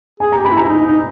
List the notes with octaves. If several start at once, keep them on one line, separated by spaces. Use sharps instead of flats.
G#4 G#5
G4 A#5
B5
E4
A#5
E4
D#4
D#4